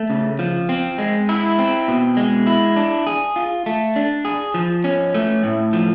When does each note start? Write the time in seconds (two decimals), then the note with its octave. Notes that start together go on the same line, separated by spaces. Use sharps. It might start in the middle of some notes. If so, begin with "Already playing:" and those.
Already playing: A3
0.10 C#3
0.39 F3
0.69 C4
0.98 G#3
1.29 E4
1.59 C4
1.88 B2
2.17 G#3
2.47 E4
2.76 D4
3.06 G#4
3.36 F4
3.66 A3
3.96 D4
4.25 G#4
4.54 F3
4.84 C#4
5.14 A3
5.43 A2
5.73 F3